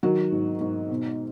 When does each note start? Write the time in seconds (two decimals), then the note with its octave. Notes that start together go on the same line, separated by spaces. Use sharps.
0.03 D#3 F#3 F#4
0.32 G#2
0.61 G#2
0.90 B2